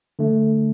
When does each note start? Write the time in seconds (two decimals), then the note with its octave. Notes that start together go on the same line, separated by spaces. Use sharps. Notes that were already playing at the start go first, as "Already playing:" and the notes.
0.19 D3 A3